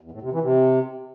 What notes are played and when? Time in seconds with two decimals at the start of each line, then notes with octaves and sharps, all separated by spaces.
0.01 E2
0.11 A2
0.22 C3
0.32 E3
0.42 C3